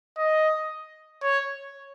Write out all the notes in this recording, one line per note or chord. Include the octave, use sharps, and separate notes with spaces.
D#5
C#5